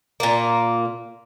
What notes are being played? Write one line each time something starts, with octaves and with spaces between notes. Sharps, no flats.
A#2 A#3